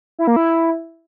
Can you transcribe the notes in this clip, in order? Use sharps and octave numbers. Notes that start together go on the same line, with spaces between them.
E4
A#3
E4